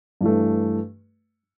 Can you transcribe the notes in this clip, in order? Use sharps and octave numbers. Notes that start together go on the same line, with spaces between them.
G2 E3 A3